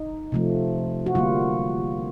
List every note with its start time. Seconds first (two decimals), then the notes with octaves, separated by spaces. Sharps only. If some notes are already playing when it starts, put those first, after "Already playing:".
Already playing: D#4
0.32 C3 F3 A3
1.06 F#4
1.15 D3 G3 A#3 F4